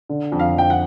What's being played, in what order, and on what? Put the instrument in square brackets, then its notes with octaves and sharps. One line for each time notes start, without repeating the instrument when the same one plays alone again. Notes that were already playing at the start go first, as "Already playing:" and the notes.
[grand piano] D3
F2
[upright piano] F5
[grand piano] F2 [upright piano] G5
[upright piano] F#5